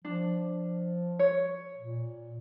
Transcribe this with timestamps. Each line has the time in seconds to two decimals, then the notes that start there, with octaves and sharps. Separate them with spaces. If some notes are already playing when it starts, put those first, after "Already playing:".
0.05 F3 D4
1.19 C#5
1.78 A#2